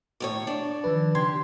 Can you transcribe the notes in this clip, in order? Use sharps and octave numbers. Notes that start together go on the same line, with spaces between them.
D#2 A2 C#5
D4
D#3 F3 B4
C#3 G4 C6 G#6